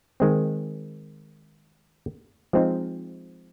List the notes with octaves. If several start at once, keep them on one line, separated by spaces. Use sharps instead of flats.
D#3 G#3 C4
F3 G#3 C4 D#4